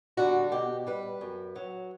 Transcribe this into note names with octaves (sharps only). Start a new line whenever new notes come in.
D3 G3 F#4
B2 G4
G3 B4
F#2
F#3